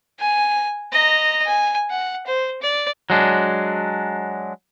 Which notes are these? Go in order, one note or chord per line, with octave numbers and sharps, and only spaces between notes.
G#5
D#5 A#5
G#5
F#5
C5
D5
F#3 G#3 D4